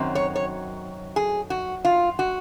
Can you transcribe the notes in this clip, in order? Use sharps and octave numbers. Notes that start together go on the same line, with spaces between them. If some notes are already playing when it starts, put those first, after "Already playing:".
Already playing: F#2 D#3 F#3 C4
C#5
C#5
G#4
F#4
F4
F#4